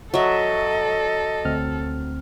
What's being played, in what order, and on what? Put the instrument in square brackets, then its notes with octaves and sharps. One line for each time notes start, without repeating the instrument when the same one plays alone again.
[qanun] F#3 E5 [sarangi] A4 [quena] D#5
[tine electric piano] D2 C4 F6